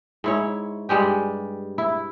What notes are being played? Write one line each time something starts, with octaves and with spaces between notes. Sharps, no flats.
G#2 E4 C#5
G2 G3 G#3 G4
E4